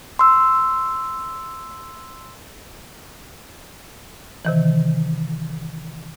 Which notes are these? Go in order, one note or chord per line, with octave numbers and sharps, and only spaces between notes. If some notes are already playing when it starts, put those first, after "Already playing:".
C6 E6
C3 D#3 E3